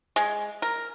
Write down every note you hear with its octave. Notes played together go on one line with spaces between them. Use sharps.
G#3
A#4